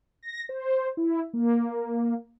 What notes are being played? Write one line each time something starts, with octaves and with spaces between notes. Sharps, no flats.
A#6
C5
E4
A#3